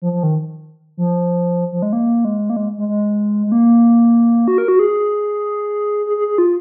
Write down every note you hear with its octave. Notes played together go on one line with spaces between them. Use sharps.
F3
F3
D#3
F3
F3
G#3
A#3
G#3
A#3
G#3
G#3
G#3
G#3
A#3
F#4
A#4
F#4
G#4
G#4
G#4
G#4
F4